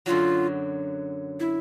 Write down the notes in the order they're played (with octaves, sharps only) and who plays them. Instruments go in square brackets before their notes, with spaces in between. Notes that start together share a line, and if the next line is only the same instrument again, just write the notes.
[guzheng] F#2 D3 F#3 [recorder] F4
[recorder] E4